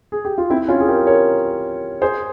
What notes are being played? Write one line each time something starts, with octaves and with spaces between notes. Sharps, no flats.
G#4
G4
F4
C4 E4
C#4 F4
G#4
G4 A#4
A#4 C#5
G#4 C5